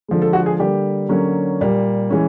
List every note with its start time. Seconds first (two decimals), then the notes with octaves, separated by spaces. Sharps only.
0.08 D3 F3 G#3
0.22 A4
0.33 F#4
0.46 G#4
0.60 D3 G3 A#3 G4
1.09 D3 F#3 A#3 C#4
1.60 A#2 G3 A#3
2.10 E3 G#3 C#4